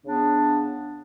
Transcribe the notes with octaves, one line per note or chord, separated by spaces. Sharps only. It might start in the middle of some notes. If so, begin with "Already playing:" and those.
C#3 B3 D4